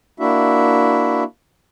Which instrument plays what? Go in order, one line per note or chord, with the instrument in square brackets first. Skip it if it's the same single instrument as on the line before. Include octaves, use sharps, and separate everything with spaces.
[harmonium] A#3 D4 E4 F#4 E5